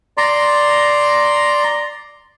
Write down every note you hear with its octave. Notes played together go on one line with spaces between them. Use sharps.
D5 A#5 C6